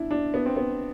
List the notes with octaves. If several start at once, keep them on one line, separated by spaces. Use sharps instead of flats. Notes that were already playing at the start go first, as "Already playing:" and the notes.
Already playing: D4 E4
D4
B3
C4
B3